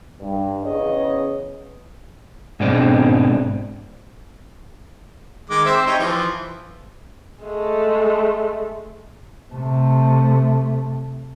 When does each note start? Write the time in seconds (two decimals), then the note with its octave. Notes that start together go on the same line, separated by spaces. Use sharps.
0.20 G2
0.64 E2 C#3 B3 C#4 C#5 D#5
2.60 G#2 B2 C4 D4
5.50 D#3 G#3 D6
5.65 C4 C5 E5
5.87 D#4 G4 C#5
5.99 E3 F3
7.45 G#3 A3
9.53 C3 A3